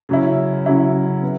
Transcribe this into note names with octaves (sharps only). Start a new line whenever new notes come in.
C#3 F#3 C#4 E4
C#3 F#3 C#4 E4
B3